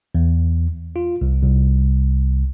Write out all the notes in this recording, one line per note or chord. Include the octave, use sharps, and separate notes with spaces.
E2
F4
C2
C2